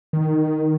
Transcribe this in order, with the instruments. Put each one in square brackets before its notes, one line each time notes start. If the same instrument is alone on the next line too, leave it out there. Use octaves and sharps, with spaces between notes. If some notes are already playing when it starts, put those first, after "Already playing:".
[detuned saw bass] D#3